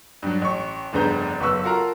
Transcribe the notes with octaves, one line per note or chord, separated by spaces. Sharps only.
G2 F#3
A1 C#6
F1 G2 C#3 B3 A#5 G6
F#1 B3 B4 C#6 E6
F4 F#4 A4 A#4 F5 A#5